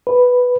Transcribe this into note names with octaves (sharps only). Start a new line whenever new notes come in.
B4